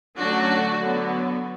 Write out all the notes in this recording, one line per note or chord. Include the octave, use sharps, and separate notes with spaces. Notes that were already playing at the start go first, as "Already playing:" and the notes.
D3 F#3 A3 C#4 D4 F#4
D3 F#3 B3